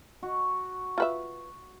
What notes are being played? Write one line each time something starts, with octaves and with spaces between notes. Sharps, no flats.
F#4
F4 B4 E5